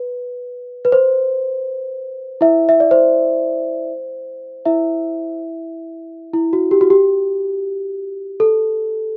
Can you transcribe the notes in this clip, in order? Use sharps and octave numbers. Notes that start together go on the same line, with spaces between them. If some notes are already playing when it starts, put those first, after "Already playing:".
Already playing: B4
B4
C5
E4 E5
E5
D5
C5
E4 E5
E4
F#4
G4
F#4
G4
A4